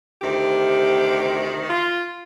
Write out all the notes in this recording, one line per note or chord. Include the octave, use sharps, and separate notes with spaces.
D2 C3 D#3 G4
F4